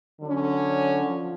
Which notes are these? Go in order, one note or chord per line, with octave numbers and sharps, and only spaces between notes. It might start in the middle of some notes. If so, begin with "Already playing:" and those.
D3 F#3 C#4
F3